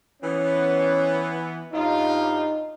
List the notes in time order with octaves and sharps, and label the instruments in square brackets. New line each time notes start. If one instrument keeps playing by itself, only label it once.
[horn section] E3 B3 [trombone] C#4
[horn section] G2 F4 [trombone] D#4